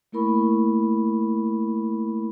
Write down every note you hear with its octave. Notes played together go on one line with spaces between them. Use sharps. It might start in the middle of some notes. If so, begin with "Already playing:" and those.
A3 A#3 E4 A#4 B5 C#6